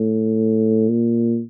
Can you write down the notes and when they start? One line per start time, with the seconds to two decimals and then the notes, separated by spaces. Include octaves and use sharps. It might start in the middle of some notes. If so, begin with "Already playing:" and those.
Already playing: A2
0.89 A#2